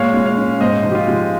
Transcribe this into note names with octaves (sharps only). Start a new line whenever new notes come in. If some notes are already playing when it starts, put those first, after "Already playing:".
Already playing: A#2 G#3 C#5 F5
G#3
C#5 F5
C#4
G#2 C5 D#5
F3
G4
F4
G#3